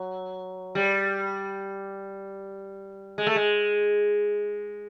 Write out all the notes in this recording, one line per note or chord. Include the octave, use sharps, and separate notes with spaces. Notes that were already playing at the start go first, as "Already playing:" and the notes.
Already playing: F#3
G3
G#3
A3
G#3